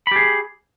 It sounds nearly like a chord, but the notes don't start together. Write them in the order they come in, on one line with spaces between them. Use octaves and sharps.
B5 G4 G#4